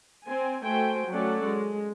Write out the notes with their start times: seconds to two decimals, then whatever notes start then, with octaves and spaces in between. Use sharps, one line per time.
0.25 C4 G#5
0.62 A3 F#4 C5 G5 G#5
1.10 F#3 A3 C#4 A4 D5 F#5
1.45 G#3